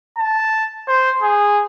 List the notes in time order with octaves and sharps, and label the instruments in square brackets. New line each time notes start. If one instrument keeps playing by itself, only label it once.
[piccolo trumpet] A5
C5
G#4